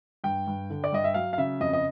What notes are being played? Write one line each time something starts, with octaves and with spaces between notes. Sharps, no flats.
G2 G5
G2
D3
D5
G2 D#5
E5
F#3 F5
F5
C#3 E5
F2 D#5
D#5